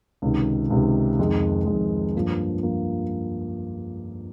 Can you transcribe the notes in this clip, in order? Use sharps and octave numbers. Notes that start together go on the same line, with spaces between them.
C#2 C3 D#3
C#2 C3 D#3
F2 D#3 G#3
F2 D#3 G#3
G2 F3 A#3
F3 A#3